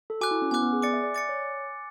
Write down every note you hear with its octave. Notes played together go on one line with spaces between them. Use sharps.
A4
F#4 G#5 D6 F#6
E4
C#4
B3 G#5 D6 F#6
B3
G#4
D5 D6 A6 C#7
E5
D5
D5 D6 A6 C#7
C#5